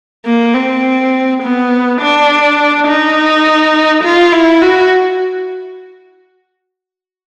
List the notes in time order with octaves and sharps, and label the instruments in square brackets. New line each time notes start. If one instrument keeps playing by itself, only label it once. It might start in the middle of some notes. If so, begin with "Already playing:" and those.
[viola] A#3
C4
B3
D4
D#4
F4
E4
F#4